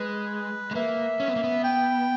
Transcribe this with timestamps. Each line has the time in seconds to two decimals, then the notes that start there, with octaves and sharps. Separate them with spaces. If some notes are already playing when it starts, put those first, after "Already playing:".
Already playing: G#3 B4
0.71 G#3
0.75 A#3 E5
1.20 C#4
1.28 B3
1.36 A#3
1.44 B3
1.64 G5